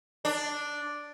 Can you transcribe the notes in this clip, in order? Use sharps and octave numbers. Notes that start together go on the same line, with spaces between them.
D4